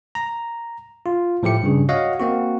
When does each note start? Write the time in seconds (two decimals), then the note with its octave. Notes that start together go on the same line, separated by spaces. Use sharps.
0.15 A#5
1.06 F4
1.43 A2 F3 A3 G4 C#7
1.63 G2 C#3
1.89 F#4 C#5 D#5 F5 F#5
2.20 A#3 C4 F#4